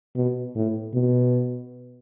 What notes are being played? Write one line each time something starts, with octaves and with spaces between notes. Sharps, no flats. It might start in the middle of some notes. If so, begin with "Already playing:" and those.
B2
A2
B2